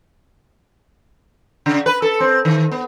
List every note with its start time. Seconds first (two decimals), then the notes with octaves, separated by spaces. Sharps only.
1.66 C#3
1.86 B4
2.02 A4
2.20 C4
2.45 D#3
2.72 B3